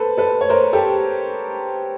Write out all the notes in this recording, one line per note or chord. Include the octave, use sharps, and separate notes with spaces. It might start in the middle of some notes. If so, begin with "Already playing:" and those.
Already playing: A4 B4 C5
A4 B4
C#5
A#4 C5
G4 A4